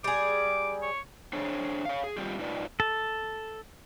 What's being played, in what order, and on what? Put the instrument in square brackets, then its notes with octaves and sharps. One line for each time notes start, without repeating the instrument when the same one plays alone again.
[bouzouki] G3 G#4 [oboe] D6
[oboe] C#5
[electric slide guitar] D4 G#4 C5 C#5
C#5 F5
G#4
G3 C4 F4 G4
G#2 D#4 F4 B4 D5
[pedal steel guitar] A4